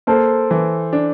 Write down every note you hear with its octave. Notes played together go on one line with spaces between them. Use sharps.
A#3 A4 C5
E3
D4